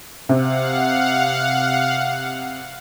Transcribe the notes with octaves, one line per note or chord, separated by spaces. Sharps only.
C3 F5 F#5